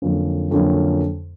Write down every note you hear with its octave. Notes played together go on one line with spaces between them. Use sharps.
F2 D3 F#3 A#3 C#4
F2 D3 F#3 A#3 C#4